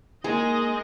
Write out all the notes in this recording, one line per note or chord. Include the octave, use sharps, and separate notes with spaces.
G#3 A#3 D#4 G#4 D#5